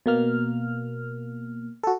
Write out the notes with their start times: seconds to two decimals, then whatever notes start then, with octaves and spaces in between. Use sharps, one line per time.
0.06 B2 A#3 F6
1.83 F#4 A4